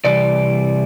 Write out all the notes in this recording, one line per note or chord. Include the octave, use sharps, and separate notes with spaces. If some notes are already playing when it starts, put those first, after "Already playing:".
C3 E3 G3 D5